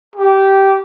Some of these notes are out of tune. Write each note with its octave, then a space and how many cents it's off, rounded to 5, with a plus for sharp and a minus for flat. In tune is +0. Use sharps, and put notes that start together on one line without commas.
G4 -15